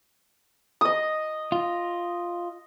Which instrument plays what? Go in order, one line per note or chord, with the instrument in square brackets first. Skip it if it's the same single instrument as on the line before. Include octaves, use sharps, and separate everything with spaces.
[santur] D#5 D#6
[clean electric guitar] F4